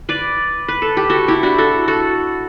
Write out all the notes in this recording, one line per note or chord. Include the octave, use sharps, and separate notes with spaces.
B4 D5
B4
A4
G4
F#4 A4
E4 G4
D4 F#4
F#4 A4
F#4 A4